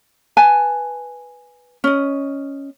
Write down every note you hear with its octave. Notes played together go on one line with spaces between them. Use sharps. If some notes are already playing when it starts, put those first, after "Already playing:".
B4 G#5 A5
C#4 D#5